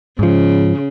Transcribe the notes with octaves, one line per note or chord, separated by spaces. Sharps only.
G#2 C#3 F3